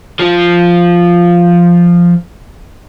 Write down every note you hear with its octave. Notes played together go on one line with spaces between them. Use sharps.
F3 F4